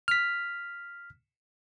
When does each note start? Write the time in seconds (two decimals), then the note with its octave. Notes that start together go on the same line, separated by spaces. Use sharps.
0.08 F6 B6